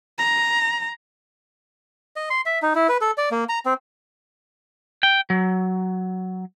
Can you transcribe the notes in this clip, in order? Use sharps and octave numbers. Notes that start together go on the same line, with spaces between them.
A#5
D#5
C6
E5
D#4
E4
B4
A4
D5
A#3
A#5
C4
G5
F#3